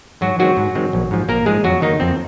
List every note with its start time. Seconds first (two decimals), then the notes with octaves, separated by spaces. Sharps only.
0.21 G#2 F#3 F#4
0.39 D#3 F#3 G#3 C4 F#4
0.57 G#2
0.75 D#3 G#3 C4
0.93 A#1
1.11 G#2 F3
1.28 A#1 A#3 A#4
1.46 G#2 F3 G#3 G#4
1.64 F2 F#3 F#4
1.82 D#3 A#3 D#4
2.00 F2 C4